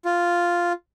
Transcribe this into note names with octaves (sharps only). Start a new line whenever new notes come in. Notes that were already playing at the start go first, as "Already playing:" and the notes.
F4